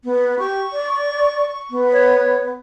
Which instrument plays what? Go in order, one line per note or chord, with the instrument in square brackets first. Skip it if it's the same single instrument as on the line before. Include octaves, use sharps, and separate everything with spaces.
[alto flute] B3
[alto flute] G4 [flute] C#6
[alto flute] D5
B3
[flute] C#5